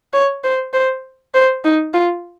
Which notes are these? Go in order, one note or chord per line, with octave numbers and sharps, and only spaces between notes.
C#5
C5
C5
C5
D#4
F4